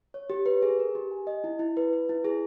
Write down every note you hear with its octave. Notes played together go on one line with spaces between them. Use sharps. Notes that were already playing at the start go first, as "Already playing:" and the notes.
C#5
G4
B4
G#4
A#4
G4
G#5
D#5
E4
E4
B4
B4
E4
G#4